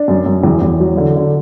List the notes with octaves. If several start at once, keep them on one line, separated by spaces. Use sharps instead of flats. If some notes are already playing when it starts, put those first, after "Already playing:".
Already playing: D4
F#2
F#2
E2
E2
F#3
D3
D3